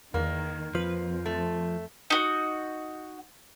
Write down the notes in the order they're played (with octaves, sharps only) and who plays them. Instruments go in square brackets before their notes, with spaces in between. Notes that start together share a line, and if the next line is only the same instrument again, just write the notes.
[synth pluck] E2 [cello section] D#3 [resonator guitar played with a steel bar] A#3
[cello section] F2 [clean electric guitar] F3 [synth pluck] B4
[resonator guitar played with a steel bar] A3
[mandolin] D#4 F#4